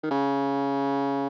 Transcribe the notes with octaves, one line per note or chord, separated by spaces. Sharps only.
D#3
C#3